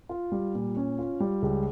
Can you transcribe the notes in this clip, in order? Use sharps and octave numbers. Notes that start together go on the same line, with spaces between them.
F4
G3
A#2
C#4
F4
G3
C#2